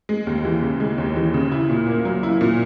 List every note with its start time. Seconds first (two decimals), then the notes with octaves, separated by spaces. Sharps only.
0.09 G#3
0.27 D#2
0.45 E3
0.62 C#3
0.80 G#3
0.98 D#2
1.16 E3
1.34 C#3
1.52 E4
1.69 A#2
1.87 A#3
2.05 F#3
2.23 E4
2.41 A#2